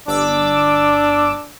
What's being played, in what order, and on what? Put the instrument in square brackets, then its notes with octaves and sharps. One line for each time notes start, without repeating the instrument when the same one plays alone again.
[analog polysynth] G1 D6 E6 [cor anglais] D4